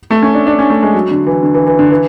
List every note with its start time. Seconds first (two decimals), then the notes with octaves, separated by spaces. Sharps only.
0.11 A3
0.23 C#4
0.34 D4
0.47 D4
0.59 C#4
0.70 A3
0.83 G#3
0.94 F#3
1.11 D3
1.27 E3
1.43 D3
1.54 E3
1.67 E3
1.79 D3
1.91 E3